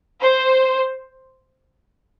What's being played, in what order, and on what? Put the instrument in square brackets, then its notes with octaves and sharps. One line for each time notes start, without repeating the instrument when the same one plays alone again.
[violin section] C5